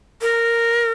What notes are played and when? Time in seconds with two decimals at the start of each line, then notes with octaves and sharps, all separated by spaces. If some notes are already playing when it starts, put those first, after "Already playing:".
0.22 A#4